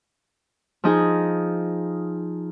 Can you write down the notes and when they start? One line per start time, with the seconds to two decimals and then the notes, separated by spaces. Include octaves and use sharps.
0.84 F3 D#4 G#4